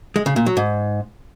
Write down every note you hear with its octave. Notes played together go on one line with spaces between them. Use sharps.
G#3
C#3
A#2
F#3
G#2